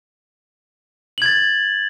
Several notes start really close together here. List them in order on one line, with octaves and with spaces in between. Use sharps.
F#7 G#6 A6